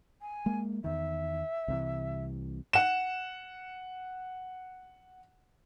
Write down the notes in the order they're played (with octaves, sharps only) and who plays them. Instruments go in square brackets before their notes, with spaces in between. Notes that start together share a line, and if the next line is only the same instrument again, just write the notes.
[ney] G#5
[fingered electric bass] G#3 A#3
[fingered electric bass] E2 D#3 [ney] E5
[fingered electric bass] C2 C3 E3
[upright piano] F#5 E7